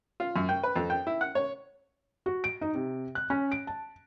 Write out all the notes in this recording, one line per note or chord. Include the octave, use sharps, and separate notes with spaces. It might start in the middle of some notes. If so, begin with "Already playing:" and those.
F4
F#2
G5
B4
F2
G5
E4
F#5
C#5
F#4
D7
D#4
C3
F#6
C#4
D7
A5